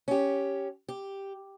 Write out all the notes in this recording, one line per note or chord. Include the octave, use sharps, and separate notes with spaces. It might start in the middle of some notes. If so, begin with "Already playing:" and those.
C#4 G4
G4